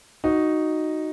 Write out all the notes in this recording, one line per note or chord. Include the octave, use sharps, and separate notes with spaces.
D#4 F#4